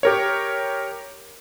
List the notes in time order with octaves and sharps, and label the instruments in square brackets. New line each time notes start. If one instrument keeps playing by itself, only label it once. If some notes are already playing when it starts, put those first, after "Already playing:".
[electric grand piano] G4 A#4 C#5